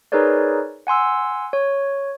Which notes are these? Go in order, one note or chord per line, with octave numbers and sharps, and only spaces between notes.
D#4 G#4 A#4 B4 C#5 D5
F#5 G#5 C6 E6
C#5